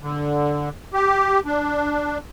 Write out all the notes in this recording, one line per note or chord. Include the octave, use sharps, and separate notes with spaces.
D3
G4
D4